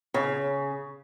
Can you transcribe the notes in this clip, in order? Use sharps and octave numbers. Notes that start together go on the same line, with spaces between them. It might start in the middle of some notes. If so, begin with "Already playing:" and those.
C#3